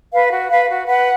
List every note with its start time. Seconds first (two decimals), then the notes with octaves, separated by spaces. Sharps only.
0.12 B4 F5
0.31 F#4
0.49 B4 F5
0.68 F#4
0.87 B4 F#5